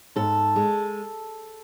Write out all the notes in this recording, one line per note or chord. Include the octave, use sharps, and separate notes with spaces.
G#2 A4
G#3